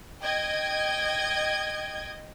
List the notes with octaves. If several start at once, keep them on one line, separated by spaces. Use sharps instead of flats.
D#5 G5 G#6